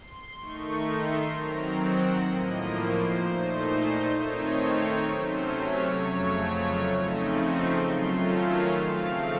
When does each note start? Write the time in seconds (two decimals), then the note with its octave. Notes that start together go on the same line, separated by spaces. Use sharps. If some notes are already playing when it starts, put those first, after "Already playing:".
Already playing: C6
0.39 D#3 A3 D#4 C#6
0.88 C6
1.34 D#3 F#3 C4 A#5
1.82 F#5
2.27 A2 F3 A#3 D#5
2.74 C5
3.22 A#2 A3 D#4 C5
4.15 D#3 A3 C4 D#4 C#5
5.10 C3 F#3 A3 C#4 C5
5.57 C#5
6.04 F2 C#3 F#3 A3
6.98 C#3 F3 A3 C4 D#4 D#5
7.30 C#6
7.61 C6
7.91 D#3 F#3 A3 C#4 F4 C6
8.23 A5
8.55 F5
8.86 C#3 F3 A3 C4